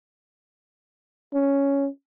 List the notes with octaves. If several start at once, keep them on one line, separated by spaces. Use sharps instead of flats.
C#4